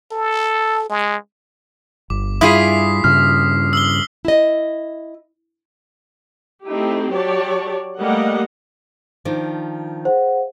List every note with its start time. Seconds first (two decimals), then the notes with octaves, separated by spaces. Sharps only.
0.12 A4
0.90 G#3
2.10 G1 D6
2.41 G2 E4 F4 G#4 D#6 B6 C7
3.04 G2 C#3 F6
3.73 E6 F#7 G7
4.25 E4 D#5
6.65 A3 C4 D#4 E4 G4
7.10 F#3 G4 C#5 D5 A5
7.99 G3 A3 A#3 D#5 F#5
9.25 D#3 F3 D4
10.05 G#4 C5 F5 F#5